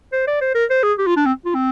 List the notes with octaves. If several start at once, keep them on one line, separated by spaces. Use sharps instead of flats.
C5
D5
C5
A#4
C5
G#4
G4
F4
D4
C4
F4
C4